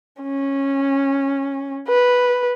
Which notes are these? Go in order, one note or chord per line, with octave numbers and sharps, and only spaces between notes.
C#4
B4